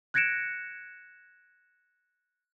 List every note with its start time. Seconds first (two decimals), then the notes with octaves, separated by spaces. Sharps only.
0.14 F#6 G#6 A#6 C#7 D7 E7